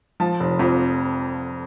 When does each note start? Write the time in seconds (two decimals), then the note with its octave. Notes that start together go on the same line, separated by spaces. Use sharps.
0.20 F3 A5
0.40 F1
0.59 F2